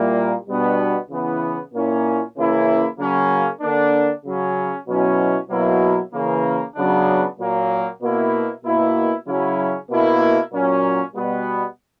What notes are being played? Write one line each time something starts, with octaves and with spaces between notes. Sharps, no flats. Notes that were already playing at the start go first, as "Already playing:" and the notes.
Already playing: A#2 G3 A#3 E4
B2 G3 B3 D4
C#3 E3 B3 E4
A#2 A#3 C#4 E4
C#3 E3 A#3 C#4 E4
C#3 F#3 A#3 C#4
D3 A#3 D4
C#3 F#3 C#4
B2 F#3 C#4 E4
B2 F#3 A#3 E4
C#3 E3 A#3
C#3 F#3 B3 D4
A#2 F#3 A#3
B2 A#3 E4
B2 A#3 E4
C#3 F#3 C#4 E4
B2 A#3 E4
A#2 F#3 C#4
B2 G3 B3